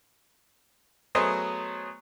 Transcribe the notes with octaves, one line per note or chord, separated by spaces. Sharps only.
F#3 A3 B3 G#4 C5 D#5